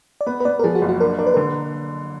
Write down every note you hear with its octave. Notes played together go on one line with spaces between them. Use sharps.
D5
B3 B4
B4
B3 D5
A#4
F3 G#4
F#4
F#1
F#4
D4 A#4
D4 A#4
B4
D3 A#4